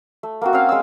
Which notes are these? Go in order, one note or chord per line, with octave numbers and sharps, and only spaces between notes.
A3
A#3 C4 F#4
C4 C#4 F5
G#3 E6